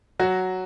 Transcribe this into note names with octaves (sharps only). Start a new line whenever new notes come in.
F#3 F#4